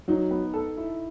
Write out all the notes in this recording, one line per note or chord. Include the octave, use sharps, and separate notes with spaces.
F#3 D#4
B3
A4
E4